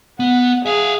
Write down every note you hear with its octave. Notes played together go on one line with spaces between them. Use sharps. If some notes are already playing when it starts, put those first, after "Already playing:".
B3 F#5
G#4 E5 F5